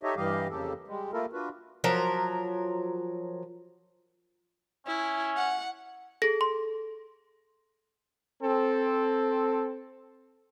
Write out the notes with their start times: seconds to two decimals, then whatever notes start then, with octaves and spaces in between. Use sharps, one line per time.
0.03 D#4 G4 A4 C#5 D#5 E5
0.16 G2 E3 G3 G4 D#5 F5
0.50 F2 C#3 A#3 G4 A4
0.87 G3 G#3
1.13 A3 A#3 E4 F4 A4 A#4
1.33 D4 F4 F#4 B4
1.84 F3 F#3 A#4
4.87 C#4 E4
5.37 F#5
6.22 G#4 A4 A#6
6.41 C6
8.42 C4 A4